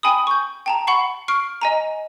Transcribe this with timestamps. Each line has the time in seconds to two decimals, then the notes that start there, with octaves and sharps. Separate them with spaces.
0.03 G5 G#5 B5 D#6
0.27 C#6 G6
0.66 G5 A5 A#5
0.87 F#5 B5 C#6 C7
1.28 C#6 F6 C7 D7
1.61 D#5 G#5 A#5